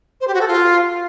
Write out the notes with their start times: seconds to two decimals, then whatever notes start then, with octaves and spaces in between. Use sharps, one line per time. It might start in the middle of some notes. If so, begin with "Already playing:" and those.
0.21 C5
0.28 G4
0.34 F#4
0.41 A4
0.48 F4